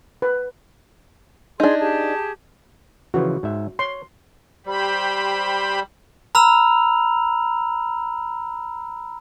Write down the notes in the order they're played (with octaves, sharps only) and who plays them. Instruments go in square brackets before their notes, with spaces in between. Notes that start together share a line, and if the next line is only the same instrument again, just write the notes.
[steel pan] B4
[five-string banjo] D4 D#4 [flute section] G#4 C6
[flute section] G4 G#4 A5
[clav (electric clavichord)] C#3 E3 F3 [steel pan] F#4
[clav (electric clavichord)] G#2 E5
[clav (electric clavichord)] C#5 [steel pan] C6
[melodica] G3 [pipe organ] G4 C5 B5
[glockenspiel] A#5 B5 E6 F6 F7